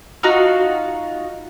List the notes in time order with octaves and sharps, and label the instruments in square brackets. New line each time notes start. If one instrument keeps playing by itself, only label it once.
[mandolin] D#4 F4 F#4